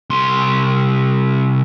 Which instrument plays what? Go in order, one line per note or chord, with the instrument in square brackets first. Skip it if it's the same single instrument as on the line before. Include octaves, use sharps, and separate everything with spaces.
[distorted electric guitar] C2 C6